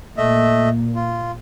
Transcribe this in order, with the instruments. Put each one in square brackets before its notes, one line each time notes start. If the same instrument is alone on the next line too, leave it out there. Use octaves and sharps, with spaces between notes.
[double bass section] A#2 A#3 [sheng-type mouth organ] A3 D#5 E5
[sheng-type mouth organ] F4